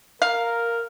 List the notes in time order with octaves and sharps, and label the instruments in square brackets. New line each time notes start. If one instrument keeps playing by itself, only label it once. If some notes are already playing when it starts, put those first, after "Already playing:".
[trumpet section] A#4 [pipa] F5